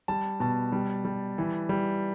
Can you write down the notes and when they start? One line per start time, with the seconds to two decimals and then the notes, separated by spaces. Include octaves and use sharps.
0.08 G3 A5
0.40 B2 A5
0.72 G3
1.05 G3
1.38 E3
1.69 G3